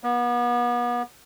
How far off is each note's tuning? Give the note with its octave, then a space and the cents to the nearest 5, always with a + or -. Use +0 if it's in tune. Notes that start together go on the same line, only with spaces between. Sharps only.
B3 -35